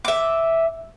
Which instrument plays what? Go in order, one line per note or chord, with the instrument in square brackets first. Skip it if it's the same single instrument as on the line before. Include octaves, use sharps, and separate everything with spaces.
[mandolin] E5 D6